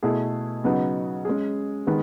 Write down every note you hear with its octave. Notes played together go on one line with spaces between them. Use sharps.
B2 A3 E4 G#4
C#3 F#3 B3 D#4 F#4
G#3 C#4 G#4
D#3 G#3 B3